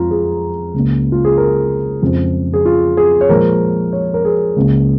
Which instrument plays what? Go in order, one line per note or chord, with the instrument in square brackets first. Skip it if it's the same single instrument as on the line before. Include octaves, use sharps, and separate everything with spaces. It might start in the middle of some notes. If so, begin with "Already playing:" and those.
Already playing: [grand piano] F2 F3 G#3 F4 A#5
G#4
C#2 C#3 A#3
F4
G#4
A#4
F2 C#3 F3 G#3
G#4
F4
G#4
C#5
A#2 F3 G#3 A#4
C#5
A#4
G#4
C#2 C#3 A#3